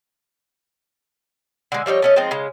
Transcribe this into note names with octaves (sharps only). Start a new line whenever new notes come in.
D3 G#3
F3 G3 D#4 C#5
A3 C#4 D#5
F3 G#3 C4 D#4
C#3 G#3